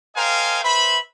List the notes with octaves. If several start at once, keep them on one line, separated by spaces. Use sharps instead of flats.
A#4 C5 D#5 F5 G5 G#5
B4 C5 E5 B5